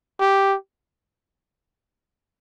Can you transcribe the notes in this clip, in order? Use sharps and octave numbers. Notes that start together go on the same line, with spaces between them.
G4